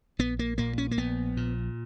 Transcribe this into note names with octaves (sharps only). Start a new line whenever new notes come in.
A#1 B3
A#3
A#2 A#3
C#4
A#3
A#1 B3
A#2